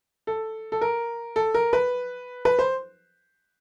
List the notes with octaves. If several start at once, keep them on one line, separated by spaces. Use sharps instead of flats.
A4
A4
A#4
A4
A#4
B4
B4
C5